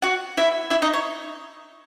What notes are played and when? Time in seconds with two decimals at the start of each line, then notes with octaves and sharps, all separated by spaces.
0.02 F#4 F#5
0.37 E4 E5
0.70 E4 E5
0.82 D#4 D#5
0.93 C#5